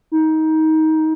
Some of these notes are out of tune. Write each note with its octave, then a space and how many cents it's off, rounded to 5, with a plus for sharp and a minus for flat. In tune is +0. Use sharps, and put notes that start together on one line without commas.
D#4 +20